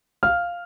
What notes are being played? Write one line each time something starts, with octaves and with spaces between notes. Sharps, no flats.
F5 F6